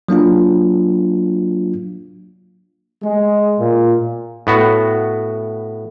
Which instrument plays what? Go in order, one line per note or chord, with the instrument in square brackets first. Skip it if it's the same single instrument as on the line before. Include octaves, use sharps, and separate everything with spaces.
[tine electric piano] F#3 A#3 D4 F4
[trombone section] G#3
A#2
[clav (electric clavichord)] A2 B3 F#4